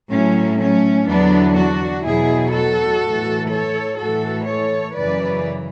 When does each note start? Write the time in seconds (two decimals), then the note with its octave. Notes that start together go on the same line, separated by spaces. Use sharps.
0.12 A2 F#3 A3 C#4
0.60 A3 C#4
1.08 E2 D3 F#3 B3 D4
1.57 D4 F#4
2.05 E2 B2 F#3 E4 G#4
2.54 F#4 A4
3.02 A2 E3
3.51 A4 C#5
3.99 A2 E3 F#4 A4
4.47 A4 C#5
4.96 F#2 C#3 E3 B4 D5